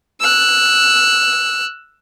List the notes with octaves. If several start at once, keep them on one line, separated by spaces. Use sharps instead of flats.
E6 F#6